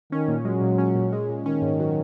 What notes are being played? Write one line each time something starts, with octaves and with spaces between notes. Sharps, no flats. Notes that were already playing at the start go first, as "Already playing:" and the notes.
D#3 C#4
A#2
F#3 G#3
A#2
C#4
A#2
G#3
A#2
D#3 C#4
G#2
F#3